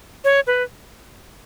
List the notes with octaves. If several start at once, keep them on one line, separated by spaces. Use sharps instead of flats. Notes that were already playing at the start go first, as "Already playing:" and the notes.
C#5
B4